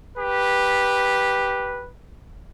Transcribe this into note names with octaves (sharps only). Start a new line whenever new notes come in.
G4 B4